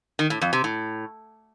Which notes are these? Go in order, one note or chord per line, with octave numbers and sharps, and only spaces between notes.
D#3
A2
F2
C3
A2